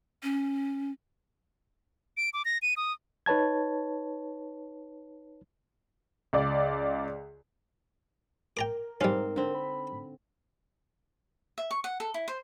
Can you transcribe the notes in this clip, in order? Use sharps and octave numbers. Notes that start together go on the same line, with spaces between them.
C#4
D7
D6
A#6
D#7
D#6
D#4 B4 C#5 A5 G#6
C#2 D5
A#4 G5 A#5 D6
G#2 G3 C4 C#4 F5
D3 C4
B5
E5
C#6
F#5
A4
E4
C5